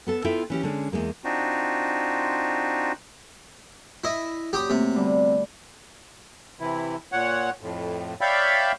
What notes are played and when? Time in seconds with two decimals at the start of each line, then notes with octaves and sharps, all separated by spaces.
0.07 B3 A4 A5
0.24 B3 E4 F4 A4 E5 G5
0.50 E3 C#4 G4
0.63 D3 G#3 C#4 D4
0.92 E2 A#2 G#3 A#3
1.24 C4 D4 D#4 F4 F#4
4.04 E4 D#5
4.25 E5
4.53 F#2 A#2 G4 D#6
4.70 C3 A3 A#3
4.95 D3 G3 B3
6.60 C3 E3 E4
7.12 A#2 C#5 F#5
7.61 F2 A2
8.21 C#5 D5 E5 F5 G5 B5